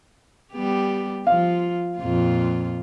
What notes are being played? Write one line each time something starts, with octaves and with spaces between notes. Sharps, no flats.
G3 B3 G4
F3 F4 F5
F2 A#2 F4